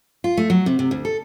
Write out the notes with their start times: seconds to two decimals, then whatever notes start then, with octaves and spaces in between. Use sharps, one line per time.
0.24 F4
0.37 A3
0.50 F#3
0.66 C3
0.79 C3
0.91 D2
1.05 A4